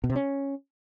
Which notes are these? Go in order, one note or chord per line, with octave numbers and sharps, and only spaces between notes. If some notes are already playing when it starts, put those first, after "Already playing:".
B2
C3
C#4